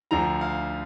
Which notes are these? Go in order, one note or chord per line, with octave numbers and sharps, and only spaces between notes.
D2 D3 F3 A#5
F5